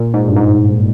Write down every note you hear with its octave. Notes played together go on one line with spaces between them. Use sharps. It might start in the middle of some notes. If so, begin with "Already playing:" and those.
Already playing: A#2
G#2
G2
G#2